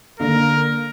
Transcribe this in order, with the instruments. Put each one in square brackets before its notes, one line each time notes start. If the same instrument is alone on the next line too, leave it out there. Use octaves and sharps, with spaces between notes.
[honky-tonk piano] D3 A#3 [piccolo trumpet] A#4